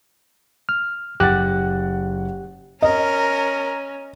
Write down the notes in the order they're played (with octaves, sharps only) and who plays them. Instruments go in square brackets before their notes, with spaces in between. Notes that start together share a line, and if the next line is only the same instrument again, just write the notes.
[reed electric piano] F6
[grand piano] F#1 F#5 A6 [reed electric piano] G4 F#6
[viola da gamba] C#4 [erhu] A#4 [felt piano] D#5